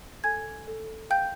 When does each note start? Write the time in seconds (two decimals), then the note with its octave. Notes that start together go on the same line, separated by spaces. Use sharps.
0.24 A4 G#5 G#6
0.67 A4
1.10 F5 G5 G6